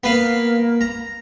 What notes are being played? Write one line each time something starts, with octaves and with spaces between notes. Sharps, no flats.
A#3 B3 B4 F5
A#5